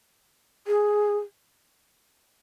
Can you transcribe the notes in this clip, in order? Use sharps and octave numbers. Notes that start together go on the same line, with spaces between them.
G#4